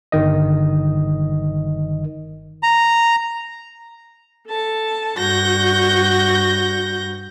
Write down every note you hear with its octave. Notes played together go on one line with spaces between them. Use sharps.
G1 D#3 D#5
A#5
A4 A5
G2 F#4 G6 A#6